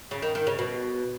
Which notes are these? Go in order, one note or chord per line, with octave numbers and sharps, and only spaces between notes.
C#3
D#3
D#3
C#3
B2